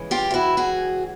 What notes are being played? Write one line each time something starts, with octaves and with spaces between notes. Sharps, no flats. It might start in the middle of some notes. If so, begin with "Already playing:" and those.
Already playing: C#3 E3 G#3
F4 G4
F4
E4 F#4
F#4 G#4